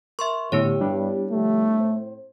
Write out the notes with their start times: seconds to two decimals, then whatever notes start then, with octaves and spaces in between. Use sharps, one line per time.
0.19 A#4 E5 C6 C#6
0.52 A2 D3 B3 E4 G4 C#5
0.81 G2 G3 D4
1.31 D3 F3 A3 G4
1.79 A2 C4 C5